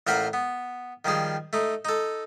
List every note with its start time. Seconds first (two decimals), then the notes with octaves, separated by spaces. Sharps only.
0.07 A1 F4 A#4 C5 F#5 B5
0.33 B3
1.05 D#3 F3 G3 G#4
1.53 A3 D#4
1.85 D#4 A4